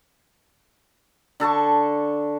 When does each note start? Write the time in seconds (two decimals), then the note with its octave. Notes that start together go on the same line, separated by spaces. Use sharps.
1.40 D3 A4 A5 C#6